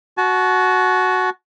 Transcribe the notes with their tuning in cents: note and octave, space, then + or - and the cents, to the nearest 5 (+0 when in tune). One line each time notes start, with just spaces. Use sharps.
F#4 +0 A5 -35